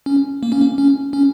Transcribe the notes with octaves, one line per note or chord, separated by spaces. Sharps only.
C#4
A#3
C#4
A#3
C#4
C#4